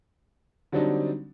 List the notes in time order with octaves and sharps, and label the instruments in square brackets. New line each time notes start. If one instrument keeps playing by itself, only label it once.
[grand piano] D3 F#3 G3 C4 D4 D#4